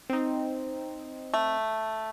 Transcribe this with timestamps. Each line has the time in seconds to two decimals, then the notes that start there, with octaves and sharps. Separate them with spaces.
0.10 C4 D#4
1.34 A3